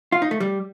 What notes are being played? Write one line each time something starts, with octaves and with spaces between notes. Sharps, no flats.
F4
D#4
A3
G3